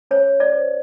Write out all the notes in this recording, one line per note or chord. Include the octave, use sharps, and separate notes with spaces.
C#4 C#5
D5
C5